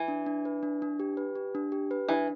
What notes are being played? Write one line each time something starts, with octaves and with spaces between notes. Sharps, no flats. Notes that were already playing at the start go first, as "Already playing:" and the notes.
Already playing: E3
D4
D4
B4
D4
D4
G4
B4
G4
D4
G4
B4
E3 D4